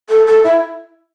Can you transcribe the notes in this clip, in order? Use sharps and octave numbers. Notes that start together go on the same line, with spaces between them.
A4
A4
E4